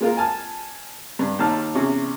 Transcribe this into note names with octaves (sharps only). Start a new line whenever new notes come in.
G#3 A#3 F4 A#4
G#5 A5 F6
G2
D#2 D#4 A5 F6
E2 C3 C#4